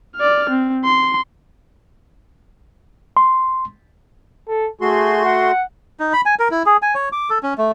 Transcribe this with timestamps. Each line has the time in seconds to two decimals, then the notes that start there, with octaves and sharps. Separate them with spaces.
0.17 D5 F6
0.50 C4
0.85 C6
3.17 C6
4.48 A4
4.81 A3 F#4 G#4 C6
5.25 F#5
6.00 D#4
6.13 B5
6.26 G#5
6.39 A#4
6.51 E4
6.66 G#4
6.82 G#5
6.95 C#5
7.12 D6
7.30 A4
7.43 C#4
7.58 A3